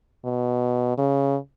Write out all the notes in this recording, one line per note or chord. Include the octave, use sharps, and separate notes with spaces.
B2
C#3